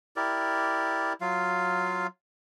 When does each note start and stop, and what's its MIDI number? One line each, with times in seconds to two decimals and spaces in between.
0.16 1.13 64
0.16 1.13 67
0.16 1.13 70
0.16 1.13 74
1.21 2.07 54
1.21 2.07 65
1.21 2.07 77